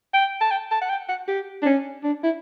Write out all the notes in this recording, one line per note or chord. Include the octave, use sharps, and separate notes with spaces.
G5
A5
G5
A5
F#5
G5
F#5
G4
D4
C#4
D4
E4